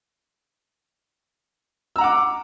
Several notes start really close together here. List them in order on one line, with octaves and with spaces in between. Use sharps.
E6 A#5 F#5 D6